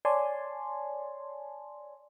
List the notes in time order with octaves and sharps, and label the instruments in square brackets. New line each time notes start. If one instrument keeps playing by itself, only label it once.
[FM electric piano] C#5 D5 G#5 A5 C6